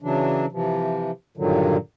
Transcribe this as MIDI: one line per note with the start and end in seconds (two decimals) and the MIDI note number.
0.02 0.46 49
0.02 0.46 52
0.02 0.46 54
0.02 0.46 62
0.52 1.11 48
0.52 1.11 52
0.52 1.11 53
1.37 1.77 43
1.37 1.77 46
1.37 1.77 50
1.37 1.77 51
1.37 1.77 54